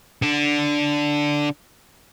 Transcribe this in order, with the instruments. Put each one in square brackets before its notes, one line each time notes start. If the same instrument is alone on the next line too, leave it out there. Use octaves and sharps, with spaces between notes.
[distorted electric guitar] D3 D4